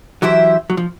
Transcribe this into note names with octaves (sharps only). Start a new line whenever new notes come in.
E3 F#3 E4 G4 C5 E5
F#3
F3